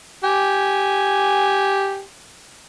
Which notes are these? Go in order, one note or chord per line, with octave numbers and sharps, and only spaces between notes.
G4 G#5